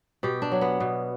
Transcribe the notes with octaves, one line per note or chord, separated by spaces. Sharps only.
B2 G4
D4
F#3
B3
B2